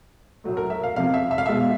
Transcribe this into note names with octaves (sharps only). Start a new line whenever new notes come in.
A2 F#3 A3
A#4
E5
F5
F2 C3 F3 F5
E5
E5
F5
B2 G#3 E5